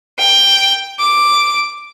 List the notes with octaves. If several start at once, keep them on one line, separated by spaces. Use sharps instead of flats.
G5
D6